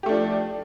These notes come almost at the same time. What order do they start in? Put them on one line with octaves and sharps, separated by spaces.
G4 A3 D4 F3